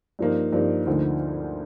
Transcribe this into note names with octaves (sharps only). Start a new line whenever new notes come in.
G2 F3 A#3 D#4
G2 F3 A#3 D#4
D2 D3 F3 A#3 D#4